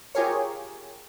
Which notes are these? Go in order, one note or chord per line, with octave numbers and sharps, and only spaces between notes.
F4 G4 G#4 A#4 C#5